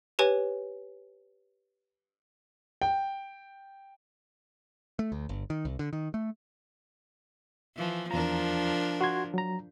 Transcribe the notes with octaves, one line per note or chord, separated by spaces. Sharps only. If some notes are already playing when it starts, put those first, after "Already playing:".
G4 B4 C#5 G#5
G5
A3
D2
G1
D#3
C2
D3
D#3
A3
E3 F3
E2 F3 D4 A#4 A#5
F#4 C6 G#6
F#3 A#5